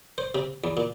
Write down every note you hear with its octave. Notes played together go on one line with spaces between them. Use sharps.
C5
C3
E2
A#2